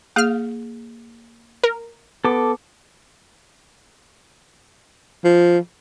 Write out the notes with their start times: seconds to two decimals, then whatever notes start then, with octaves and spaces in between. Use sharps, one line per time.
0.16 A#3 G#4 F5 F6
1.63 A#4
2.25 B3 A4 D6
5.24 F3